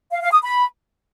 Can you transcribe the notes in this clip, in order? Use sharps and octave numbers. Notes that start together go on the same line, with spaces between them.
F5
F5
D#6
B5